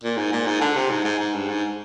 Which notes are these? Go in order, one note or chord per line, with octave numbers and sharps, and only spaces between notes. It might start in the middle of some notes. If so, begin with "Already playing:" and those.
A#2
G#2
A#2
G#2
D3
C3
G#2
G#2
G#2
G2
G#2